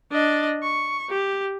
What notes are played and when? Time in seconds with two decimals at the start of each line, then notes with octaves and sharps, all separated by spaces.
0.11 D4 D#5
0.63 C#6
1.10 G4